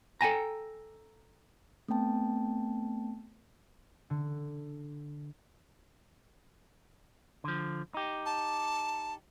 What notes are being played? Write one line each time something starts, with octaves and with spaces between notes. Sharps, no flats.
A4 G5 G#5 A#5
A3 B3 C4 G5 A5
D3
D3 F3
D#4 G4
A5